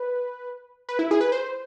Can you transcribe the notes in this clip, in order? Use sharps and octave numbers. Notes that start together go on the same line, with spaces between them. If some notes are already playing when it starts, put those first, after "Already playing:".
Already playing: B4
B4
E4
G#4
B4
C5